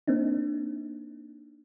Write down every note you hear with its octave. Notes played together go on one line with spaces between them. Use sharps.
A#3 C4 D4 D#4